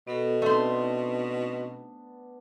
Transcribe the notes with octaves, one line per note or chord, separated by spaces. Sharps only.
B2 B3 F#4 A4
A3 B3 C4 D4 D#4 C5